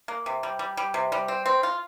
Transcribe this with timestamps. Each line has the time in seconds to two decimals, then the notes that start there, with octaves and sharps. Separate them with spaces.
0.08 A#3
0.26 C3
0.43 G3
0.59 G3
0.77 G3
0.94 C3
1.12 G3
1.28 C4
1.46 C4
1.63 F4